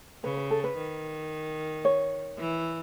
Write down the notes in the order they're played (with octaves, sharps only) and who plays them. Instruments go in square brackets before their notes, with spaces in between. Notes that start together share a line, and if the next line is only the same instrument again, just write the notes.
[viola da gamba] C#3 [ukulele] B4
[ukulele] B4
A4
B4
[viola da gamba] D#3
[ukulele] C#5
[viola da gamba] E3